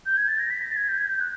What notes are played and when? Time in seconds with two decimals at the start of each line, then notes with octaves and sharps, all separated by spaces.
0.06 G6
0.17 G#6
0.28 A6
0.40 A#6
0.51 B6
0.62 A#6
0.71 A6
0.77 G#6
0.88 G6
0.98 G#6
1.07 G6
1.20 F#6